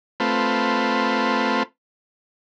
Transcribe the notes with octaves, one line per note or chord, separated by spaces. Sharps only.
A3 C4 F4 B4